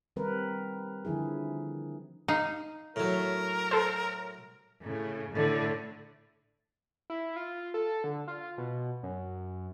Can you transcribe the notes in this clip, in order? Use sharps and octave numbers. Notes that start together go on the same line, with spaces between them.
D#3 G3 C4 A#4 B4
D3 D#3 F3 E4 G#4
D#4 F5
A2 F#3 A#4
A4 C5
A2 C#3
A2 D3
E4
F4
A4
D3
F4
B2
F#2